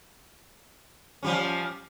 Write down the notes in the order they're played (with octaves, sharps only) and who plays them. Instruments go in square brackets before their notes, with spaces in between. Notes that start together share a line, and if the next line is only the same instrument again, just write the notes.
[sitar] F3 G3 C#4